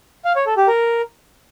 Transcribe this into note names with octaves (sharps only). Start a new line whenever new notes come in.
F5
C#5
A4
G4
A#4